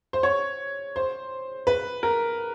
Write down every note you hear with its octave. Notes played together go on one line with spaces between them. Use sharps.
C5
C#5
C5
B4
A#4